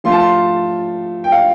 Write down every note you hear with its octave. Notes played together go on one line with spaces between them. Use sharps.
F3 A3 F4 C6
A5
C6
G5
F5